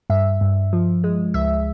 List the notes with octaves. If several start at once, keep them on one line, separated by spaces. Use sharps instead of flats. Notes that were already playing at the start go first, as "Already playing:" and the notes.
G2 E5
G2
F3
G#3
C#2 E5